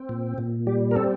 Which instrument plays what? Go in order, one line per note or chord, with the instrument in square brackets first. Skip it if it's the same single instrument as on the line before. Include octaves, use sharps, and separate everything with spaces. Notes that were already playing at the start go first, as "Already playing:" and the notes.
Already playing: [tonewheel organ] C4
A#2
A#2
G3 G4
A#4
C4 A4